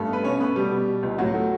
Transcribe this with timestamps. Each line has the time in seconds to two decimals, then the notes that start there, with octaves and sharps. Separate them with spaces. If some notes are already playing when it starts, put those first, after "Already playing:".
Already playing: G2 A3 A4
0.08 B3 B4
0.24 B2 C#4 C#5
0.40 A3 B3 B4
0.56 B2 G3 G4
0.72 B2
0.87 B2
1.03 C#2
1.18 A2 F#3 F#4
1.34 A3